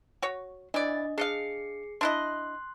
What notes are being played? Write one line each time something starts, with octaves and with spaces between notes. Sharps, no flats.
F#4 C#5
E3 D4 D5 D#5
D4 G#4 D#5 F5 C7 C#7
D4 E4 D#5 C6 F#6